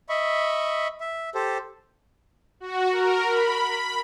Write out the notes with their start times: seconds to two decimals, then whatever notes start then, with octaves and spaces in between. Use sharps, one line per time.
0.09 D#5 E5 B5 C#6
1.00 E5
1.35 G4 A4 C5
2.60 F#4
2.92 A#4
3.28 B5